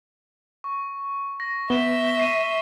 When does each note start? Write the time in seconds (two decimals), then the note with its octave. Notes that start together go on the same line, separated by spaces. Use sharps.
0.64 C#6
1.40 A#6
1.70 B3 E5 B6 E7 G7
2.18 C#6 C7 D#7